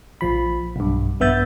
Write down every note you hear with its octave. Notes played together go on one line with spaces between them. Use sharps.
A#1 F3 B5
B1 G2
A#1 G2 B3 E5 G6 A6